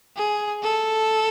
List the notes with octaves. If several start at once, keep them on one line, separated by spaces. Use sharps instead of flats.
G#4
A4